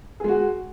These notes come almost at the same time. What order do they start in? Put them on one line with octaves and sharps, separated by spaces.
G#4 G#3 F#4